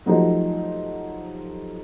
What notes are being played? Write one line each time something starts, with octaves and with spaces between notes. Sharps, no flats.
F3 F#3 A3 D#4 G4 G#4